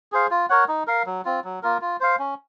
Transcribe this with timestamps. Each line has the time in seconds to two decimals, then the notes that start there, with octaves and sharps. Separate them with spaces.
0.12 G#4 C5 F5
0.31 F4
0.50 A#4 C#5 F#5
0.68 D#4
0.87 A#4 F5
1.06 F#3
1.25 C4 F4
1.44 F#3
1.63 A#3 F4 A#4
1.81 F4
2.00 C5 F5
2.19 C#4